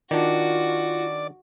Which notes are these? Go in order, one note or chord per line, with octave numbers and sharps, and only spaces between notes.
D#3 D4 F4 F#4 D5